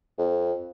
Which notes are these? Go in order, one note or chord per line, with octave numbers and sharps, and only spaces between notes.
F2